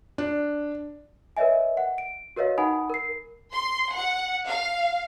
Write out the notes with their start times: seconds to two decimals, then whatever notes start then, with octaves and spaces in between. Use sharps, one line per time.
0.18 D4
1.37 A#4 B4 C#5 D#5 E5 G#5
1.77 F#5
1.98 D7
2.36 F#4 A#4 B4 C#5 D#5 F5
2.58 D#4 F#5 G#5 B5 D#6
2.90 A#4 C7
3.54 C6
3.96 F#5
4.48 F5